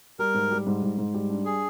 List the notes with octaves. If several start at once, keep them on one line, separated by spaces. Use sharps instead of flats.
G3 A#4
G#2
G3
G#2
G#2
G#2
G3
D4
G#4